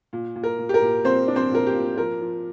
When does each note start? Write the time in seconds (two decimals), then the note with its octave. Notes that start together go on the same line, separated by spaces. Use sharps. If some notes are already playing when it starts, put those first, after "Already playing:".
0.13 A#2
0.36 A#2
0.43 A#4
0.59 A#2
0.69 G4
0.74 A#4
0.82 A#2
1.05 A#2 C4 C5
1.28 D4
1.36 C4 C5
1.51 A#2 A#4
1.66 G4
1.74 A#2
1.97 F3 A#4
2.21 F3